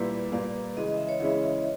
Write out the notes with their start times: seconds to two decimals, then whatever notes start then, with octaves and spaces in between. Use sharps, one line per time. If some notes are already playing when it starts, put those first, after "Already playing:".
Already playing: A#2 G3 A#3 E4 B4
0.32 A#2 G3 A#3
0.77 C#3 E3 G#3 D#5
0.87 D#5
0.98 E5
1.09 C#5
1.20 C#3 E3 G#3 C#4 E4 E5